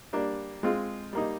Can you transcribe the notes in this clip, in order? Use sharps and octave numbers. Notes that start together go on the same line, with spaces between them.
G3 A#3 D4
G#3 C4 F4
G3 A#3 D#4